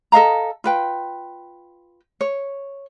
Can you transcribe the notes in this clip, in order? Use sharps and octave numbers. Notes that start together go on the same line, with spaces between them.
A4 D#5 F5 A#5
F4 B4 G5
C#5